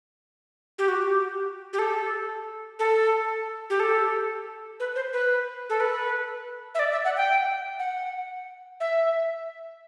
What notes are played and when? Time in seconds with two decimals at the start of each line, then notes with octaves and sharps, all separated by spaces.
0.78 G4
0.88 F#4
0.96 G4
1.73 G4
1.79 A4
2.79 A4
3.70 G4
3.80 A4
4.80 B4
4.96 C5
5.13 B4
5.70 A4
5.80 B4
6.75 E5
6.79 D5
6.92 E5
7.05 F#5
7.17 G5
7.79 F#5
8.80 E5